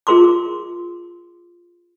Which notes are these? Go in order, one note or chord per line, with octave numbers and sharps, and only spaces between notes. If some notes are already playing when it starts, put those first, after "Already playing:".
F4 G#4 A#4 C6 D6